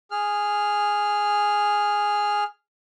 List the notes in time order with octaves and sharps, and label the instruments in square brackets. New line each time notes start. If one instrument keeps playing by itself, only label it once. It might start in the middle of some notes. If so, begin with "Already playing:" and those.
[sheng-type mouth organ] G#4 F6